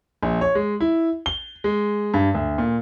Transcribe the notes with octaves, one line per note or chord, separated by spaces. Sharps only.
A#1
C#5
G#3
E4
G7
G#3
G2
D2
A#2